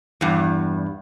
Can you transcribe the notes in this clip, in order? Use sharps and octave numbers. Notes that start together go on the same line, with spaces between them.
E2 G2